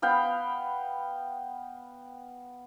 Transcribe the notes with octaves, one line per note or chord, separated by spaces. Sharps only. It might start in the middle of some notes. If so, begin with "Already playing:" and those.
B3 F5 G5 B5